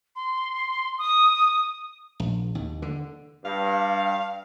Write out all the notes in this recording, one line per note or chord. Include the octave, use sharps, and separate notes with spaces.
C6
D#6
A#1
D#2
D3
G2 F5